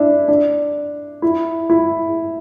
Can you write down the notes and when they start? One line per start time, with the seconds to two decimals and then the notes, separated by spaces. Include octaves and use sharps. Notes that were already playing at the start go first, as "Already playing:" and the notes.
Already playing: D4 E4
0.28 D4
1.22 E4
1.70 E4